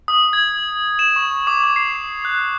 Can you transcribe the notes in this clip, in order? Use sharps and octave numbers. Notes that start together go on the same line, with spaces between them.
D#6
G#6
E7
C#6
D6
D6
C7
F#6